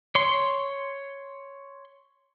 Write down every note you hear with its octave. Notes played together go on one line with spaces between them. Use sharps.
C#5 C6